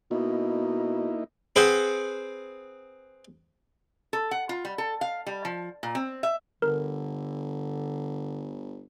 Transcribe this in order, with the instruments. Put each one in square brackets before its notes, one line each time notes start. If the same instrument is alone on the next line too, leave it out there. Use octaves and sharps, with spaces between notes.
[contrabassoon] B2 [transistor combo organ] A#3 D#4 E4
[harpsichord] C4 G#4 B4 C5 F#5 G5
[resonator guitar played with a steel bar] A4
F#5
F4
G3
A4
F5
G3
F3
A#2
C4
E5
[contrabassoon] G1 [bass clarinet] D3 [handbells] A#4